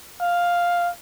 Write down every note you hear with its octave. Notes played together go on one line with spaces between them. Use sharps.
F5